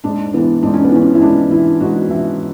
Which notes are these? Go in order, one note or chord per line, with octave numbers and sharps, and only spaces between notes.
G#2 D4
E3 B3
G#2 D4
C#4
B3
E3 C#4
E4
G#2 D4
E3 E4
G#2 F#4
E3 E5